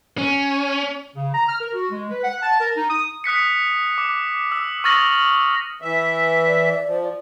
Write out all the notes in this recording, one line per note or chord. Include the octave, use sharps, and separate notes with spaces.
C#4
C#3
A#5
F6
A#4
F#4
G#3
B4
F#5
A5
A#4
D#4
D#6
D#6 F#6 B6 C#7
D6
E6
C#6 D#6 F6 A6 A#6 F#7
E3 E5
D5
F3